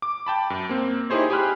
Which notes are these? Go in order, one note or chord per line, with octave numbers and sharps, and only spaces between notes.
D6
G5 A5 B5
F#2
A#3 C4
D#4 E4 G4 G#4 C5 C#5
G4 G#4 G#5 B5 F6 F#6